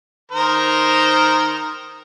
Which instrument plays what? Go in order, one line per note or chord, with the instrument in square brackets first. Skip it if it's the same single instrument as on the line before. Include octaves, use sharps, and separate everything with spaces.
[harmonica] D#3 A#4 C5